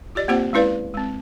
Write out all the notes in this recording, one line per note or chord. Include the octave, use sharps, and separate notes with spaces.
F4 G4 D5 D#5
A#3 C4 F4 G4 C5 F#5
G#3 C#4 E4 B4 D5 F5
G#3 C4